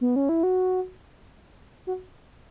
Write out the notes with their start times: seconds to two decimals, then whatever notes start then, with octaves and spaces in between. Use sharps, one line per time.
0.01 B3
0.16 C#4
0.29 E4
0.43 F#4
1.87 F#4